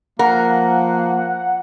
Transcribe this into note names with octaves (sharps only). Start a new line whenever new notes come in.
F3 A#3 A#4 F#5